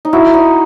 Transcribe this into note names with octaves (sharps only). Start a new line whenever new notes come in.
D#4
E4 F#4
D#4